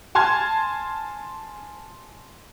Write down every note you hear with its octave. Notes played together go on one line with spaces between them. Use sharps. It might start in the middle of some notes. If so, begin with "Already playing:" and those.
G#5 A5 C6 F6 G#6